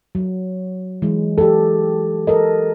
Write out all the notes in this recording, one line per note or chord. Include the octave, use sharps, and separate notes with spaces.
F#3
E3 G#3
G4 A4
A4 A#4 D#5